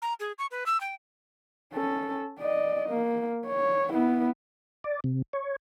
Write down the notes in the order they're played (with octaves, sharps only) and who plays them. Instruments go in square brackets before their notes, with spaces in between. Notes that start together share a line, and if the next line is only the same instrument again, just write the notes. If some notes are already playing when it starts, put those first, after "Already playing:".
[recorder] A#5
G#4
C#6
B4
E6
G5
[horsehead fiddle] C#4 A4
D5 D#5
A#3
C#5
B3 E4
[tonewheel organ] D5
C3
C#5